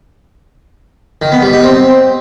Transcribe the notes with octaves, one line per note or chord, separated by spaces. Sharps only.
D#3
B3
G3
D#4
C4